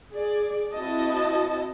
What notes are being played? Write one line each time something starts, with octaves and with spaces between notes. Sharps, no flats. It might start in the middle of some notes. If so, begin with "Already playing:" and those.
G#4 D5
C4 E4 F#4 D#5 A5